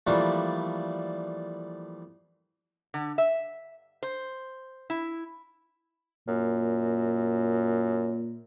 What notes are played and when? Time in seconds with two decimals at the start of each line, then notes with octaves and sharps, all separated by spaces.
0.07 E3 F3 G3 A3 A#3 D4
2.94 D3
3.18 E5
4.03 C5
4.90 E4
6.28 F#2 A#2